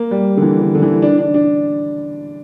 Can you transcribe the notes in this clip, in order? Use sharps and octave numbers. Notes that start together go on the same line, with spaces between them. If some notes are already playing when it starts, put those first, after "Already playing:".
Already playing: A#3
G3
D3
E3
D3
D3
E3
D4
D4
D4